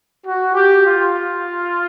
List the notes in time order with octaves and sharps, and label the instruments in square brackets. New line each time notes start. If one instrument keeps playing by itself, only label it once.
[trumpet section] F#4
G4
F4